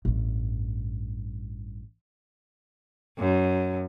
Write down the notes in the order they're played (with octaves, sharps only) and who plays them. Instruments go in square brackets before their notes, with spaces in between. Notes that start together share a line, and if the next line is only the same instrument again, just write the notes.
[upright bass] A1 G2
[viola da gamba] F#2